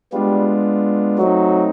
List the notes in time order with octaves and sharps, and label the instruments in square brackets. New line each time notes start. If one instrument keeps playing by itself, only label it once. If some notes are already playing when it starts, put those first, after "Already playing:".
[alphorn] G3 [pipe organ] G#3 B3 D4 F4
[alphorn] F#3 [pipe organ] A3 C4 D#4